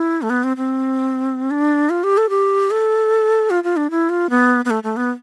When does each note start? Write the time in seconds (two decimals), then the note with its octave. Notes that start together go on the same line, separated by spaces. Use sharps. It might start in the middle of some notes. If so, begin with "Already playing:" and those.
Already playing: E4
0.22 A3
0.30 B3
0.44 C4
0.57 C4
1.51 D4
1.90 F4
2.04 G4
2.17 A4
2.30 G4
2.71 A4
3.50 F4
3.64 F4
3.77 D4
3.91 E4
4.09 F4
4.30 B3
4.65 B3
4.70 A3
4.83 A3
4.97 B3